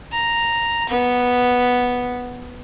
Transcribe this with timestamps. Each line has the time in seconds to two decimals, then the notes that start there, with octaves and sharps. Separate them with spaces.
0.12 A#5
0.89 B3